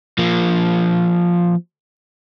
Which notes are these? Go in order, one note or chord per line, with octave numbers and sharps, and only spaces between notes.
F3 A#3